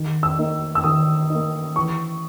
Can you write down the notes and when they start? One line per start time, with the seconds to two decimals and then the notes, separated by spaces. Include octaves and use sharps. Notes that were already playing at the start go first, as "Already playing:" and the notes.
Already playing: D#3
0.23 E6
0.38 A#3 D#4
0.75 E6
0.84 D#3 D#6
1.30 A#3 D#4
1.76 E3 C#6